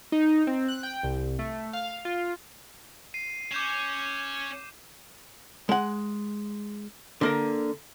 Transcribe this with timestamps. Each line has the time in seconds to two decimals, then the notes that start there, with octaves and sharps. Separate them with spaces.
0.12 D#4
0.47 C4
0.68 F#6
0.83 G5
1.03 C2
1.39 A3
1.73 F5
2.05 F4
3.14 C7 D#7
3.52 C#4 D6 G6 E7
5.69 G#3 F#5
7.21 D3 A#3 A#4